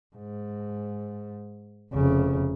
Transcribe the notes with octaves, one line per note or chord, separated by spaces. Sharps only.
G#2
F1 C#3